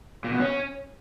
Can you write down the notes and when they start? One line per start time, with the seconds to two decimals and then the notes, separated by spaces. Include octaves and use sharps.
0.24 A#2
0.32 B2
0.40 C#4